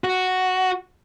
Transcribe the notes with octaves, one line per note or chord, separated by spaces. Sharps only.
F#4